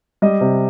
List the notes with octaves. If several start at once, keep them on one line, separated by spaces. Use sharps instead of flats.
G3 D#5
C3